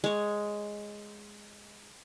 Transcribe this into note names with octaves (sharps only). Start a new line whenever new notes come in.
G#3 C#5